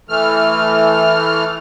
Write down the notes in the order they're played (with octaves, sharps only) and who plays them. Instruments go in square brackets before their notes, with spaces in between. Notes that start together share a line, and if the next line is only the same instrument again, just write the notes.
[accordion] E3 A3 F6